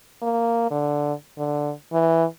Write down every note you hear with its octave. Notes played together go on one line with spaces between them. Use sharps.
A#3
D3
D3
E3